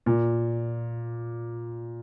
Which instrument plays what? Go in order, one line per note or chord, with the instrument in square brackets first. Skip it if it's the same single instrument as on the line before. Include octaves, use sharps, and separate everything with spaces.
[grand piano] A#2